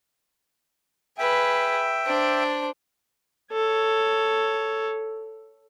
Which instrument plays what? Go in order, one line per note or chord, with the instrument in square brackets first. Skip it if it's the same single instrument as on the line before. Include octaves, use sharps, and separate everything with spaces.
[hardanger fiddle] G#4 B4 [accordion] E5 G5
[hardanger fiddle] D4 C5
[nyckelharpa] A4 C#5